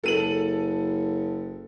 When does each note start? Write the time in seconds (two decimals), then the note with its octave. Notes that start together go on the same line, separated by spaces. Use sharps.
0.04 F#1 A4 D#7 F#7